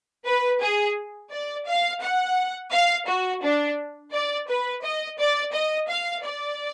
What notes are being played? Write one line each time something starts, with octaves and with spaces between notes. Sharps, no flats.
B4
G#4
D5
F5
F#5
F5
F#4
D4
D5
B4
D#5
D5
D#5
F5
D5